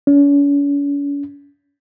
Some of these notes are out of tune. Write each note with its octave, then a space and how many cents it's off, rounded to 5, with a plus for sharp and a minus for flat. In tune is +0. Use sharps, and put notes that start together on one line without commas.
C#4 +40